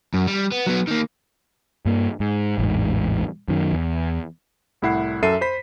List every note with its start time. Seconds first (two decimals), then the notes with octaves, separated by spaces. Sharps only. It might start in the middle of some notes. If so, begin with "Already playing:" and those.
0.14 F#2
0.27 G3
0.52 B3
0.67 F#3 B3
0.88 D#3 A#3
1.85 G2 A#3
2.20 G#2
2.58 A1 E2 G#2
3.48 F#2 D#3
3.73 E2
4.82 C2 A2 E4 F#5 C7
5.23 F#2 A4 E5 C7 D#7
5.41 C5 B5 B6